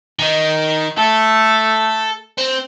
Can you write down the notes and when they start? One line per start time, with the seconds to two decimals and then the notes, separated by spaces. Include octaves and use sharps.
0.19 D#3 D#4
0.97 A3 A4
2.38 C4